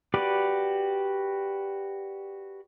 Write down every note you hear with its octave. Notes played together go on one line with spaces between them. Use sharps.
F#4 G4 B4 D5